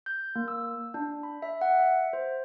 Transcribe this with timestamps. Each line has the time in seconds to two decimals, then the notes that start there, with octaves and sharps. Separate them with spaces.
0.06 G6
0.36 A#3
0.48 E6
0.94 D4
1.23 B5
1.42 E5
1.61 F#5
1.79 E5
2.13 C5